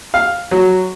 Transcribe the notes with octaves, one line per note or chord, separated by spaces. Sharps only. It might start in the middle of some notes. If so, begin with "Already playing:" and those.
F5
F#3